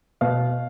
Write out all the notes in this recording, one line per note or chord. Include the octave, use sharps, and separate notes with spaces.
B2 F5